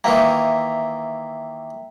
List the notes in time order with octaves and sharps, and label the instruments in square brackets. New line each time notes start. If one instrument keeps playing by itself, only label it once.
[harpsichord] D#3 E3 A#3 [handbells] E5 G5 A#5